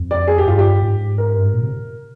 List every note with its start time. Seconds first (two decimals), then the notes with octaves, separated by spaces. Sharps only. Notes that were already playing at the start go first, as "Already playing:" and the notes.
Already playing: F2
0.11 D5
0.28 G#4
0.38 G4
0.46 G2 F4
0.59 G4
0.82 G#2
1.18 A#4
1.37 G2
1.45 G#2
1.53 A#2
1.62 C3